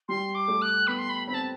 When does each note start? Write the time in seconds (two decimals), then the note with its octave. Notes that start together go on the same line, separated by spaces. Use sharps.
0.08 G3 C6
0.35 D6
0.48 A3
0.62 F#6
0.87 B3 B5
0.98 C6
1.09 B5
1.27 C4 B5
1.34 A5